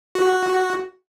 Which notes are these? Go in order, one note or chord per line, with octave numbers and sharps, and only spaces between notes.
F#4